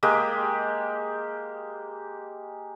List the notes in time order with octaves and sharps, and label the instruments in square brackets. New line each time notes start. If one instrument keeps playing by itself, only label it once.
[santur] G#3 A#3 G4